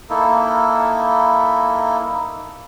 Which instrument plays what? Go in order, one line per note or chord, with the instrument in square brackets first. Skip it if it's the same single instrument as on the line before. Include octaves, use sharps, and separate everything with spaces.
[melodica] A#3 D#4 E4 A4